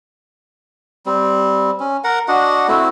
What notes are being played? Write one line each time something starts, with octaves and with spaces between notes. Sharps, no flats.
G3 C4
C#4
A#4 F#5 A#5
D4 F#4 D#5 F#5
A3 C4 E4 F#4